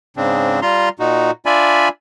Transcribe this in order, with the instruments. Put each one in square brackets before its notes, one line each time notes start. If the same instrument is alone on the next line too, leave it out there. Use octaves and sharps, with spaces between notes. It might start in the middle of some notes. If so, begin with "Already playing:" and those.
[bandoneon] G#2 C#3 C4 D4
G3 F4 A#5 C6
A#2 D#4 F#4
D4 F4 D5 E5 G#5 B5